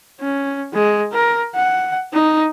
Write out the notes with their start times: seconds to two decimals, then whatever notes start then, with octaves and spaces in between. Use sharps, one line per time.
0.21 C#4
0.74 G#3
1.13 A#4
1.55 F#5
2.13 D#4